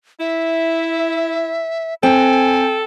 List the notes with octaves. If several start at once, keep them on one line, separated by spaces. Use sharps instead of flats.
E4 E5
C4 A4 G5 G#5